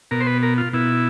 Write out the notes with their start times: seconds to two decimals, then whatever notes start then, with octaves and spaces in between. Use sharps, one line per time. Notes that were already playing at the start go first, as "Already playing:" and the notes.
0.11 B2 A#4
0.20 C5
0.27 B4
0.43 A#4
0.58 F4
0.73 B2 E4